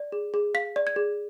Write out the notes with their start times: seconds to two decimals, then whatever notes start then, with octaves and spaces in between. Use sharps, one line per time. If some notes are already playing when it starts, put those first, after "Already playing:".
Already playing: D5
0.12 G#4
0.34 G#4
0.54 F5 B6
0.76 D5
0.87 G#6
0.96 G#4